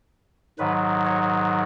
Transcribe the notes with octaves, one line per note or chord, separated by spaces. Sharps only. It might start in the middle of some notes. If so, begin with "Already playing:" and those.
G#2 D#3 F#3 B4
C#5